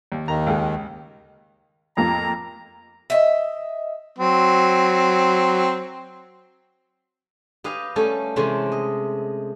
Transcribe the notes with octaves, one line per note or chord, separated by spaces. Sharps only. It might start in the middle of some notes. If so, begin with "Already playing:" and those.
D#2
D#2 D#3 A#5
C#2 G#4
F2 A#3 A#5
D#5 E5
F#3 C4
G4 B4 D#5 F5 G#5
G3 A3 C#4 A4 G#5
C3 E3 G#3 A3 C4 C#4
D#5